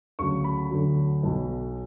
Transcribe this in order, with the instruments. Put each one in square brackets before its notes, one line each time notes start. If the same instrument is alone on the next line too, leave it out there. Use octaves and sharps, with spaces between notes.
[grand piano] D2 C#3 F#3 C#6
B5
D2 D3 F#3
B1 B2 F#3